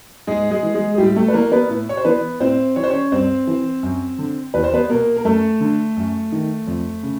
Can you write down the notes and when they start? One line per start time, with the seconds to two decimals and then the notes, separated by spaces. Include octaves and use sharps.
0.27 G#2 G#3 G#4
0.51 G#3 G#4
0.63 E3
0.74 G#3 G#4
0.94 G#4
0.98 A2 G3 G4
1.16 A3 A4
1.28 B4
1.34 E3 A#3 A#4
1.52 B3 B4
1.69 A2
1.89 C#5
1.97 C5
2.05 E3 B3 B4
2.40 A2 C4 C5
2.76 E3 C#5
2.84 C5
2.90 C#4 C#5
3.12 G2 C4 C5
3.47 E3
3.83 F#2
4.18 D3
4.54 E2 B4
4.64 C5
4.74 B3 B4
4.90 B2 A#3 A#4
5.17 A#4
5.25 F#2 A3 A4
5.60 D3
5.97 F#2
6.32 D#3
6.67 F2
7.03 C#3